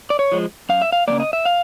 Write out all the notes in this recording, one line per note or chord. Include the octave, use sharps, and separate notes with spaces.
D5
C#5
F3 G#3
F#2 F5
E5
F5
C#3 F3 A#3 D5
D#5
E5
F5